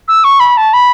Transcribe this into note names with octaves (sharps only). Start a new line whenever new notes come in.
E6
C#6
B5
A5
B5